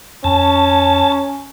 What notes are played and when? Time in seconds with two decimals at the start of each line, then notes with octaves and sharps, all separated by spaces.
0.24 F2 C#4 A5